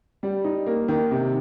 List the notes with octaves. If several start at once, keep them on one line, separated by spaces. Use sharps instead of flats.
G3
D#4
A#3
D#3
C3